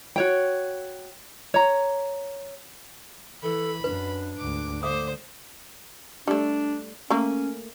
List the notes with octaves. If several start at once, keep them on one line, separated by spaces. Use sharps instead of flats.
F#4 C#5 G5
C#5 A#5
E3 A4 B5
F#2 D4 B4
D2 G#2 D6
D3 A3 C5 F5 D6 D#6
G3 A3 D4
A3 A#3 C#4